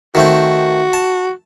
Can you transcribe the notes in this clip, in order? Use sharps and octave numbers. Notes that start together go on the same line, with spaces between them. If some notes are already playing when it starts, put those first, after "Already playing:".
D#3 A3 C4 F#4
A5